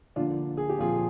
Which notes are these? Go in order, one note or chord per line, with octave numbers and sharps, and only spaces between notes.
D3 F3 A#3 D4 F4
G#4
G4
A#2 F3 C4 F4 G#4